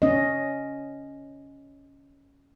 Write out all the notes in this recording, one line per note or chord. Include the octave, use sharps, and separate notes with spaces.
C#4 D#5